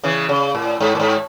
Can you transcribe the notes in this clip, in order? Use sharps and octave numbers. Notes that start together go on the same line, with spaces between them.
C#3 E3
C#3
A2
G#2
A2
G#2